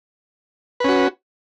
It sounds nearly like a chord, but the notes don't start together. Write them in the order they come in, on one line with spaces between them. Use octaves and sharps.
B4 C#4 F#4